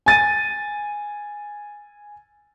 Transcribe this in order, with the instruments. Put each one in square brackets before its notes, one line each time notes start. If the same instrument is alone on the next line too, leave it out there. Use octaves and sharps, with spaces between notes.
[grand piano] G#5 A6 D#7